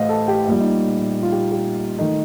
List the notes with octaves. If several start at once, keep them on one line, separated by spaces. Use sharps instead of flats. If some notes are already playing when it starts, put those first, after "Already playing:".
Already playing: A1 A2 A3 C5 D#5 F5
A4
G4
A#1 A#2 G3
D#4
F4
G4
G4
D#3 A3 D#4